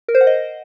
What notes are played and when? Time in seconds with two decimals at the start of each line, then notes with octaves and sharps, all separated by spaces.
0.08 A#4
0.15 C5
0.21 F#5
0.27 D#5